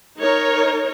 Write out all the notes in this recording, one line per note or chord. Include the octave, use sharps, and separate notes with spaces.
D#4 A#4 C#5